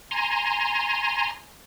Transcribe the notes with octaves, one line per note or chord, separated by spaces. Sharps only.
G#5 A#5 C6